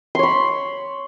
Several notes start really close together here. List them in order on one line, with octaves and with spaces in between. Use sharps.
C6 C#5 B5